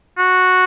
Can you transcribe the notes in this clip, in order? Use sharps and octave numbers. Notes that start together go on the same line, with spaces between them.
F#4